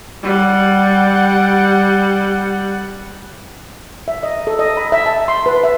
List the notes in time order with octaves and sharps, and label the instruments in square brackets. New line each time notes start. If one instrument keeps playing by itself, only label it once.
[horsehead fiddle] G3 F#5
[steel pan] E5
D#5
A4
D#5
B5
E5
A5
C6
B4
E5